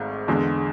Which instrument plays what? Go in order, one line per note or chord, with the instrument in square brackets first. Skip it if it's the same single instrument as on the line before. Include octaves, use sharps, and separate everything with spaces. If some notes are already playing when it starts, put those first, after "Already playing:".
Already playing: [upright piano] G#1 G#2 A3
E2 D3 G#3